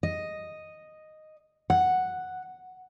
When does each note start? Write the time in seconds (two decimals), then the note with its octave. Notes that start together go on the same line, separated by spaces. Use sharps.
0.03 D#5
1.70 F#5